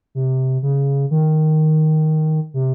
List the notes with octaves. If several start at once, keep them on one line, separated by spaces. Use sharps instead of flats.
C3
C#3
D#3
C3